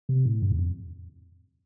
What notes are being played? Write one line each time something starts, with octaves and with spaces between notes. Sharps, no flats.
C3
A2
G2
E2
F2